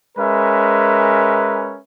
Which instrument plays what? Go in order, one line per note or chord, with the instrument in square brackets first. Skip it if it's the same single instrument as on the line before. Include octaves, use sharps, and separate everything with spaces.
[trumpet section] G#3 C#4 A#4 B4 E5